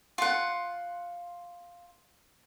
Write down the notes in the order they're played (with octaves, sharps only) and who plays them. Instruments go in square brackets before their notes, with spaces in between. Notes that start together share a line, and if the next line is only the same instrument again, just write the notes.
[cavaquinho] F4 F#5